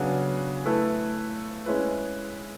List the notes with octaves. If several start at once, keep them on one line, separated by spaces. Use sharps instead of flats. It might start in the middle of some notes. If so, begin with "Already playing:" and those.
Already playing: C#3 F#3 B3 D4 G#4
A3 E4 B4
G#3 C#4 E4 B4